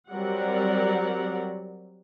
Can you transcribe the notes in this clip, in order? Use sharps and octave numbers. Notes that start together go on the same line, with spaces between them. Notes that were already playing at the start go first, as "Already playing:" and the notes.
F#3 G3 C4 A#4 D5 F#5